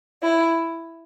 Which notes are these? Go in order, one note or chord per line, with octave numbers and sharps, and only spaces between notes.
E4